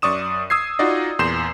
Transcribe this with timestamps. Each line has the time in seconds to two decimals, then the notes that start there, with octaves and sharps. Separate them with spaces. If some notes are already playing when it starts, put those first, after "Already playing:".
0.02 F#2 D5 C#6 D#6 E7
0.50 D#6 E6 G#6 C7
0.79 D#4 F4 F#4 D5 D#5
1.19 E2 A#2 C6 G6 C7 E7